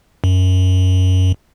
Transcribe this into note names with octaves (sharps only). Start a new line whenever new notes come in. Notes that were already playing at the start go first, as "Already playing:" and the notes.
F#2